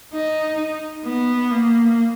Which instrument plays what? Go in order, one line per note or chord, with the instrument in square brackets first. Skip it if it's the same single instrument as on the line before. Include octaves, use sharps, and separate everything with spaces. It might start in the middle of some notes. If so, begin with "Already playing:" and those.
[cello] D#4
B3
A#3